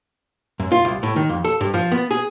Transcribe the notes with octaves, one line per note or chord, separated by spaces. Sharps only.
F#2
F4
C2
A2
D#3
F2
A4
G2
F3
B3
G#4